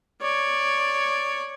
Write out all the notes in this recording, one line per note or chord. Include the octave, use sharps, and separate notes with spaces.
C#5 D5